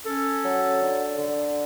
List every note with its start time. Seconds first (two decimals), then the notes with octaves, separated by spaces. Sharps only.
0.06 C#4 A4
0.43 F#3
0.79 D3
1.15 D3